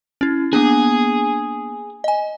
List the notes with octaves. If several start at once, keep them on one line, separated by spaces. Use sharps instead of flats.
C#4 E4
A#3 B3 D4 G#4
D#5 G#5